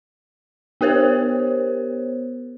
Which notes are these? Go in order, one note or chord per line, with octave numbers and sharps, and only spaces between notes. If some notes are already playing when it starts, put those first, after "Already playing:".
B3 G4 A#4 C5 C#5